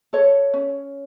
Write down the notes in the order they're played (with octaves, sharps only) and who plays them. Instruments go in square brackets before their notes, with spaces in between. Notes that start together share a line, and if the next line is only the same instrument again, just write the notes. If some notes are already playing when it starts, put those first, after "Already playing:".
[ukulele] A4 C#5
C#4